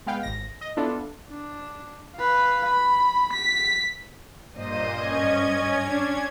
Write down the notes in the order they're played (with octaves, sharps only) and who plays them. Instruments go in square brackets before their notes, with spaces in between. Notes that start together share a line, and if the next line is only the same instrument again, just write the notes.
[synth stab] G#3 B3 F5 G5
G#1 A#6
D#5
B3 D4 E4 F4 A4
[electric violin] D4
B4 F5
B5
B6
[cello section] G2 D#5 [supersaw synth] A#2 C5
[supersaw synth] C#4 G#6
[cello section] D4